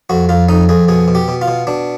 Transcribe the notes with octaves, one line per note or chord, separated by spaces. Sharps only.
F2 F#4
F2 F4
F2 D#4
F2 G#4
B2 G#4
B2
G4
B2
F4
B2
B2 D4